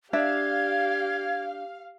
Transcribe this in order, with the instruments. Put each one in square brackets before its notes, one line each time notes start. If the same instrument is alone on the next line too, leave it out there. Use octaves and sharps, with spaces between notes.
[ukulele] D4 E5 [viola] G4 [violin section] F5 [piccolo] G#6